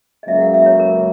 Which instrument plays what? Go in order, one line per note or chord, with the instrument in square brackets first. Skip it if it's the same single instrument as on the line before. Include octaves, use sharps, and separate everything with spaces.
[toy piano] D#5
[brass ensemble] C#2 C#3 F#3 A#3 [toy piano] E5
[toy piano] F#5
E5
C#5
A#4